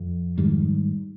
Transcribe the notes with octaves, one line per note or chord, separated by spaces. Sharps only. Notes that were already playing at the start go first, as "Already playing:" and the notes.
Already playing: F2
G#2 D#3 G3